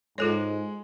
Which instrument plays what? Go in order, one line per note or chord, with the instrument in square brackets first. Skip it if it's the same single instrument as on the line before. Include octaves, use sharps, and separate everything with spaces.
[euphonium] G#2 [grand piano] G#3 [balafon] F4 A4 C#5